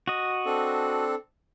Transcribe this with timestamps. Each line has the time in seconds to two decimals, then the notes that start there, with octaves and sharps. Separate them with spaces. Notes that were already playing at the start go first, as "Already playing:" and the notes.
0.08 F#4 D#5
0.46 C4 D4 A4